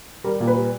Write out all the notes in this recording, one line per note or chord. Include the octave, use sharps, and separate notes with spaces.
G3 A#4
A#2
B4
G3